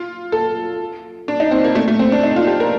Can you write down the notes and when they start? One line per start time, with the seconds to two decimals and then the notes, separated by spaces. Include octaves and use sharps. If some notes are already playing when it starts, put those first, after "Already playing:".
Already playing: F4
0.32 A4
1.28 D4
1.40 D#4
1.51 C4
1.64 A#3
1.75 A3
1.88 A3
1.99 C4
2.12 D4
2.23 D#4
2.36 F4
2.47 G4
2.60 A#4